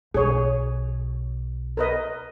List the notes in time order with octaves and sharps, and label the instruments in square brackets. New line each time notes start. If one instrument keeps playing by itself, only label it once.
[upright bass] B1 [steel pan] G#4 C#5
[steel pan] A#4 B4 D#5